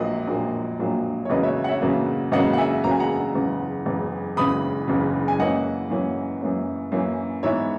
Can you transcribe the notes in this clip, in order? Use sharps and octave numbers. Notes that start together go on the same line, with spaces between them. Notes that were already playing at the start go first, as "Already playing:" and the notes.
Already playing: A#1 A#2 F#3 A#3 B4 D#5
A#1 A#2 F#3 A#3
A#1 A#2 F#3 A#3
C#5
E2 C#3 F#3 A#3 B4 D#5
C#5 E5
F#5
C#5 E5
E2 C#3 F#3 A#3
E2 C#3 F#3 A#3 D#5 F#5
F#5
E5 G#5
E2 C#3 F#3 A#3 A#5
G#5
F#5 A#5
F#1 E2 C#3
F#1 E2 C#3
F#1 E2 C#3 B5 D#6
F#1 E2 C#3
G#5
F#2 E3 A#3 C#4 D#5 F#5
F#2 E3 A#3 C#4
F#2 E3 A#3 C#4
F#2 E3 A#3 C#4
G#2 E3 B3 C#5 E5